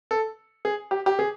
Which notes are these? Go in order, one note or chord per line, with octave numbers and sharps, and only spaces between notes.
A4
G#4
G4
G4
G#4